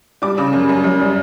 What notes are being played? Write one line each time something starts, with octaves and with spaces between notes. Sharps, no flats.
G3 D6
C#3
F#2
F#2
F#2
G3